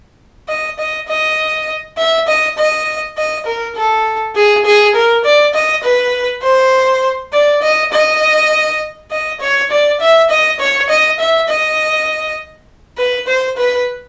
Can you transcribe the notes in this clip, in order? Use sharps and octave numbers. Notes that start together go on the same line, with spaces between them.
D#5
D#5
D#5
E5
D#5
D#5
D#5
A#4
A4
G#4
G#4
A#4
D5
D#5
B4
C5
D5
D#5
D#5
D#5
C#5
D5
E5
D#5
C#5
D#5
E5
D#5
B4
C5
B4